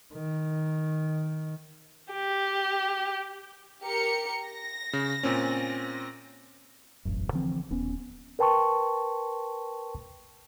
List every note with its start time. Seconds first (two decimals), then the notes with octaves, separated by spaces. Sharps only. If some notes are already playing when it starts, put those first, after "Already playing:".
0.14 D#3
2.13 G4
3.82 G4 A#4 C#7
4.46 A#6
4.93 C#3
5.23 A#2 C4 C#4
7.05 E1 A1 F#2
7.33 D3 E3 F3 C4
7.70 D#1 B3 C#4
8.39 A#4 B4 G5 A5 C6 C#6